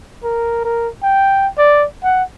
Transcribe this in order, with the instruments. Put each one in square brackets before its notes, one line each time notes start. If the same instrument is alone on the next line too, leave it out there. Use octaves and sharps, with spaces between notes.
[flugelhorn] A#4
A#4
G5
D5
F#5